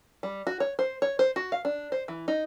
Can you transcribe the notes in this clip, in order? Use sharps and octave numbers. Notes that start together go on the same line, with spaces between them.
G3
F#4
C#5
C5
C#5
C5
F#4
F5
D4
C5
E3
D#4